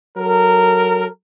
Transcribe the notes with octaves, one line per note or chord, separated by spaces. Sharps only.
F#3 A4 A#4